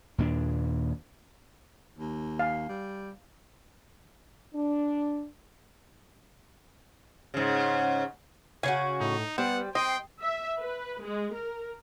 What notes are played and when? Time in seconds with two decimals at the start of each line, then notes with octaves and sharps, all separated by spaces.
0.18 D#2 A#2 A#3 D4
1.98 D#2
2.39 F5 G#5
2.69 G3
4.54 D4
7.34 G#2 C#3
8.63 C#3 C#4 F#4 G#5
9.00 A2 D#4
9.38 G3 B3 C5 F#5
9.75 C4 D#5 G5 C6
10.21 E5
10.59 B4
11.04 G#3
11.34 A#4